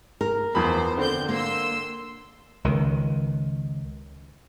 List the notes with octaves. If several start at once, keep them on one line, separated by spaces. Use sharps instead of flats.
A#4
E2 F3 C5 B5
D3 C4 G6
A#3 C6 E6
C#2 D#3